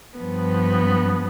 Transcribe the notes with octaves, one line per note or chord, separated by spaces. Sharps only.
G2 F3 B3